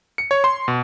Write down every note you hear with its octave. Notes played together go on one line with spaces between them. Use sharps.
C#7
C#5
C6
B2